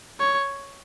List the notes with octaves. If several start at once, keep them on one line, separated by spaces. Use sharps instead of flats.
C#5